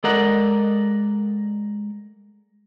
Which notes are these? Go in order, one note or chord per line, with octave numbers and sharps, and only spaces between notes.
G#3 A4 A#4 D5 D#5 F#5